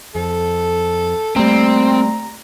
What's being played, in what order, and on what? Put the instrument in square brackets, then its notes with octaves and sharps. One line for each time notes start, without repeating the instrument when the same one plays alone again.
[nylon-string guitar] F2 [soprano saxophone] A4
[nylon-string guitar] G3 A#3 [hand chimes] A3 D5 [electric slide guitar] C4 [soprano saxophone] A#5